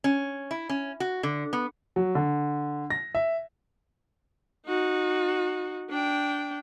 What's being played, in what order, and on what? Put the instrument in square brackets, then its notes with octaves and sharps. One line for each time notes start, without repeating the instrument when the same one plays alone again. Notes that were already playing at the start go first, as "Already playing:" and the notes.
[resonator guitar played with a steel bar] C#4
E4
C#4
F#4
D3
B3
[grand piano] F#3
D3
A#6
E5
[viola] D#4 F#4
D4 G5